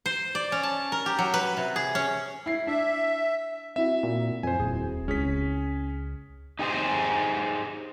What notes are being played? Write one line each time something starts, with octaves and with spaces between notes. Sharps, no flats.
C5
D5
C#4
A5
A#4
G4
F#3
B4
C3
G#4
C#4
E4 C7
D4 E5
C4 E4 F#4 E5
A#2
F2 C5 G#5
D#1 G#4
C#2 C#4 G#4 B6
D#4 G4 G#4 C5